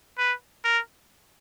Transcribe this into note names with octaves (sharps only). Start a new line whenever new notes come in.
B4
A#4